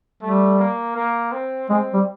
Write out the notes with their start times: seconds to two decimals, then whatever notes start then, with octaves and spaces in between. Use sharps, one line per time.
0.22 G3 A3
0.59 A#3
0.96 A#3
1.33 C4
1.69 G#3 C4
1.93 G3